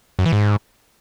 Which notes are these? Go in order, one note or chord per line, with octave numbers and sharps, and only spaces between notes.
F#2
E3
G#2